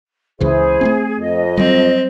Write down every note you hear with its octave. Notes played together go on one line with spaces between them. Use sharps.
C#2 C#3 E3 E4 G#4 C5
A3 B3 C4
F2 D#5
F#3 G3 C4